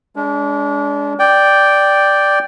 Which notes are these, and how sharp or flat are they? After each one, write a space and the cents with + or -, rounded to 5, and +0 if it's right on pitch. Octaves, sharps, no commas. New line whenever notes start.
G#3 +0 D4 -35
D5 +0 G5 +0